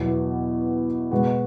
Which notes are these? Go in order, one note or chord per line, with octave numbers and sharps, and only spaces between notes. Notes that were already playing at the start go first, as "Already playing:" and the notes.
Already playing: E2 B2 F#3 B3 E4
B2 G#3 B3 F#4 B4